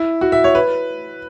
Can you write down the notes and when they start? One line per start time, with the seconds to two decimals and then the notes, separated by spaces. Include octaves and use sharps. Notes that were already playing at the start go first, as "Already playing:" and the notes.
Already playing: E4
0.21 F#4
0.32 E5
0.44 C#5
0.55 B4